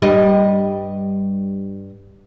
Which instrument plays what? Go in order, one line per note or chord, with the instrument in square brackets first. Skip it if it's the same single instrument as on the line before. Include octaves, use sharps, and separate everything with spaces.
[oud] G2 G3 D#5